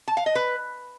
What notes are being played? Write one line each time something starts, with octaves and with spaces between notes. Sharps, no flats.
A5
F5
D#5
B4